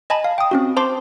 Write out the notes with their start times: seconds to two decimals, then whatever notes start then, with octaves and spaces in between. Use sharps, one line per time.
0.10 D#5 G#5 A5 B5
0.24 F5
0.38 G5 D#6
0.51 C4 C#4 F#4
0.77 C5 A5 C6 D6